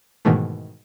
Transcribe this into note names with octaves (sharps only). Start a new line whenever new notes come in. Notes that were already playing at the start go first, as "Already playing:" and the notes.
G#2 B2 D#3 E3 A3